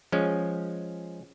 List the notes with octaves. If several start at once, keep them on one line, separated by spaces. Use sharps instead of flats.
F3 G#3 C#4